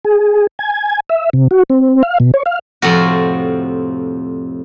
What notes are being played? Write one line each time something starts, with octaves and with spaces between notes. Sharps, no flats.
G#4
G#5
E5
C3
F#4
C4
F5
B2
C#5
F5
F2 A2 C3 C4 F4 F#4